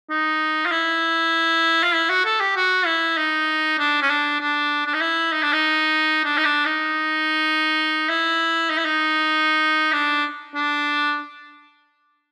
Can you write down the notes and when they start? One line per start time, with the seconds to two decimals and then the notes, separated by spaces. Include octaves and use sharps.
0.10 D#4
0.66 F4
0.71 E4
1.83 F4
1.95 E4
2.09 F#4
2.25 A4
2.40 G4
2.56 F#4
2.86 E4
3.17 D#4
3.79 D4
4.02 C#4
4.09 D4
4.40 D4
4.86 D4
4.94 D#4
5.01 E4
5.32 D#4
5.42 D4
5.53 D#4
6.24 D4
6.37 D#4
6.45 D4
6.65 D#4
8.09 E4
8.70 D#4
8.78 E4
8.85 D#4
9.92 D4
10.55 D4